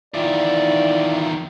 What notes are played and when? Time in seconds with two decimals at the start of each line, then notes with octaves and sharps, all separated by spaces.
0.14 E2 D#3 E4 F4 D5